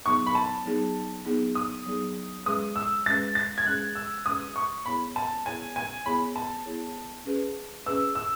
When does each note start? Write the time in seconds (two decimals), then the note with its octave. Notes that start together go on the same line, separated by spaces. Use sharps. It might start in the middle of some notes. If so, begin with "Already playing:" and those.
0.06 F#3 B3 D#4 G#4 C#6
0.27 B5
0.35 A5
0.65 F#3 B3 D#4 G#4
1.26 F#3 B3 D#4 G#4
1.55 D#6
1.86 F#3 B3 D#4 G#4
2.46 G#3 C#4 G#4 B4 D#6
2.76 E6
3.06 G#3 C#4 G#4 B4 A6
3.35 A6
3.58 G#6
3.66 G#3 C#4 G#4 B4 F#6
3.95 E6
4.25 G#3 C#4 G#4 B4 D#6
4.56 C#6
4.86 B3 E4 G#4 C#5 B5
5.16 A5
5.46 B3 E4 G#4 C#5 G#5
5.76 G#5
6.05 B3 E4 G#4 C#5 B5
6.36 A5
6.66 B3 E4 G#4 C#5
7.26 C#4 G#4 B4
7.86 C#4 G#4 B4 E6
8.15 E6